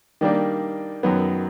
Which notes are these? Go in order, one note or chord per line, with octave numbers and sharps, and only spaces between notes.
D#3 G3 A#3 D4
F#2 D#3 F#3 B3